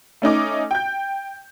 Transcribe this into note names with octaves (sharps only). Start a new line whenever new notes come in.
A3 C#4 D#4 D6
G5 G6